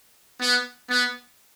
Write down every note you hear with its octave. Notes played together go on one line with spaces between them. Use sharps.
B3
B3